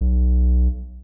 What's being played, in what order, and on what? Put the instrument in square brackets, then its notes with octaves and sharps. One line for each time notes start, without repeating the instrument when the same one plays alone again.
[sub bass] B1